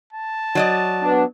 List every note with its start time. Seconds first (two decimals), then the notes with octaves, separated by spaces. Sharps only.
0.13 A5
0.55 F#3 D5 D#5
1.03 B3 D4